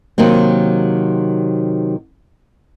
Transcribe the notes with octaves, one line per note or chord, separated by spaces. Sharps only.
C3 D#3 F#3 A#3 C4